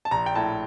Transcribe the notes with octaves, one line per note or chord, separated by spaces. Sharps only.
A5
A#1 A#5
G5
A2 A5